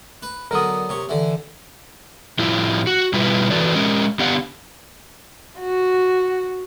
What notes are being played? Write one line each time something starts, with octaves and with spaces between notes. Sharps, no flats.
B4
D3 F#3 B3 A#4 D#6
C3 C#5
D3 E3
A2 F3 E4 F4
F#4
B2 G3 E4 F4 B4
E3 F#4 A4 B4 D5
G#3 C#4 A#4
D3 B3 G4 D5 F5 F#5
F#4